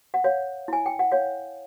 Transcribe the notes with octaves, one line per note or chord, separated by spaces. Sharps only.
F#5
C#5 F5
E4 G#5
G5
F#5
C#5 F5